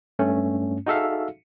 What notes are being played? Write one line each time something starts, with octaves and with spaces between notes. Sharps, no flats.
G2 A3 C#4
D#4 F#4 G#4 A4 E5 F5